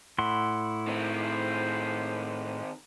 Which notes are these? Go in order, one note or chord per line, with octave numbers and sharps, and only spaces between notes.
A2 E4 F#5 C6
D#3 C4 C5